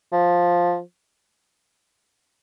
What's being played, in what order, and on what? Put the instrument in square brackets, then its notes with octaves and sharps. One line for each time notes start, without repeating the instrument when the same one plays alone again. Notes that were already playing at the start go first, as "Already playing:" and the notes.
[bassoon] F3